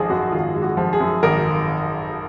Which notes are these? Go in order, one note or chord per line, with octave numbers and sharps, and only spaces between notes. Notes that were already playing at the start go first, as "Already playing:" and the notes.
Already playing: G#1 F3 G#3 G#4
F#2 F#4
G#1 F4
G#3
F#4
F3
G#4
F#2
G#1 A#4